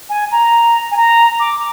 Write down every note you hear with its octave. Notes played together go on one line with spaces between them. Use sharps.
G#5
A#5
G#5
A#5
D6